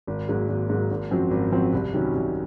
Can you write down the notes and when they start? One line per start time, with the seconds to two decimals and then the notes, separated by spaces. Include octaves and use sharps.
0.07 G#1
0.28 G#2 F#3 A#3
0.49 G#1
0.69 G#2 F#3 A#3
0.91 G#1
1.11 F#2 F3 C4 F#4
1.31 G#1
1.52 F#2 F3 C4 F#4
1.73 C2
1.93 C3 D#3 F#3 C#4
2.14 C2